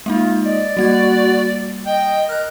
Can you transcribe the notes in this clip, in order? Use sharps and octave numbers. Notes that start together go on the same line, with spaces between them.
G#3 A#3 D#4 F4
D5 D#5
G3 A#3 F#4 G#6
D#5 G5
A#4 F6 F#6